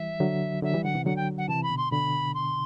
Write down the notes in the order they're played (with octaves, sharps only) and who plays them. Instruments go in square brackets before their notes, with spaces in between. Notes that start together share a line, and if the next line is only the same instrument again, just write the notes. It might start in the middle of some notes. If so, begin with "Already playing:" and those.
Already playing: [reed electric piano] E3 G3 [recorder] E5
[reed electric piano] D3 F#3
[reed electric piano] D3 F#3 [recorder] E5
[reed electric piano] E3 G3
[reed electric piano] D3 F#3 [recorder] F#5
[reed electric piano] C3 E3
[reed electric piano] D3 F#3 [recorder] F#5
[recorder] G5
F#5
[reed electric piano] C3 E3 [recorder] A5
[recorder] B5
[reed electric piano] B2 D3
[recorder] C6
[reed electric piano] B2 D3 [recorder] B5
[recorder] C6